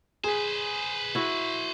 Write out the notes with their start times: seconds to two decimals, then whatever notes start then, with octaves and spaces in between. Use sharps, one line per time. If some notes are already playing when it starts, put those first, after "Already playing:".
0.24 G#4 B4 C5
1.15 E4 F#4